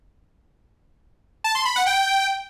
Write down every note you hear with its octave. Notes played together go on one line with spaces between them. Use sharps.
A5
C6
B5
F#5
G5